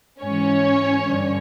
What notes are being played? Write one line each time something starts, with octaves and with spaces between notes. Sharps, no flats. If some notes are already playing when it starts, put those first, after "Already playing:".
G#2 E3 C#4 C#5
G2 D3